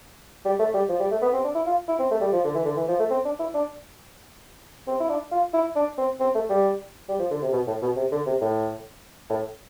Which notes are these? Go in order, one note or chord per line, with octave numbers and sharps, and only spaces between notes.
G3
A3
G3
F3
G3
A3
B3
C4
D4
E4
F4
E4
C4
A3
G3
F3
D3
E3
D3
E3
F3
A3
C4
D4
E4
D4
C4
E4
D4
F4
E4
D4
C4
C4
A3
G3
G3
F3
D3
C3
B2
A2
B2
C3
D3
C3
A2
A2